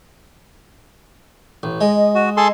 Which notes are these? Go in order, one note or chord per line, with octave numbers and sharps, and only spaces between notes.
A1
G#3 D#5
F#4
G#4 A4 C6